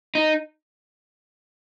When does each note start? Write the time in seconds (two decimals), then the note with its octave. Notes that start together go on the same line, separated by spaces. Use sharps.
0.15 D#4